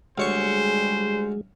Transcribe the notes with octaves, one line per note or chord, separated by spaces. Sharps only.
D2 G3 G#3 G#4 C5 C#5 C#6